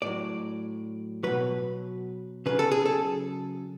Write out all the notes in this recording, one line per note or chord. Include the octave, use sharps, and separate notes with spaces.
A2 F#3 D5
B2 F#3 B4
C#3 F#3 B4
A4
G#4
A4